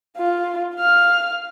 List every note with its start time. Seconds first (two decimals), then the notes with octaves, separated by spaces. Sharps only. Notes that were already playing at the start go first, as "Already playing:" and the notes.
0.17 F4
0.76 F5 F6